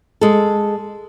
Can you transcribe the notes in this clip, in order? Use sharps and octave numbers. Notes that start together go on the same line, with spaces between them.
G#3 A4